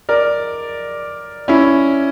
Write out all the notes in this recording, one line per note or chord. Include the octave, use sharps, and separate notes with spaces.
A#4 D5
C#4 E4